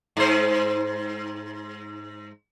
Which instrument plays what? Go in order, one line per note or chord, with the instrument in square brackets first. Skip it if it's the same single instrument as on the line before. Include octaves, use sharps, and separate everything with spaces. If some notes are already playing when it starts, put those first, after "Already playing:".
[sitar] G#2 C5